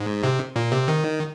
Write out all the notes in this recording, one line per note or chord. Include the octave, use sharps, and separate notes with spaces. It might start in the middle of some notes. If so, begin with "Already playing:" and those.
Already playing: G#2
C3
A#2
C3
D#3